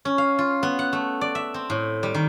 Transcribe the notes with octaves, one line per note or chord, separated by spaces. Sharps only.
C#4
F5
F4
B3
F#5
A3
D5
E5
C4
A2
G3
D#3